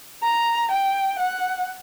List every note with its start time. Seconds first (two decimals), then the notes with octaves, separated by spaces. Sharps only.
0.23 A#5
0.71 G5
1.19 F#5